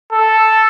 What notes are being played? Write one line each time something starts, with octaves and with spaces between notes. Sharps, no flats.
A4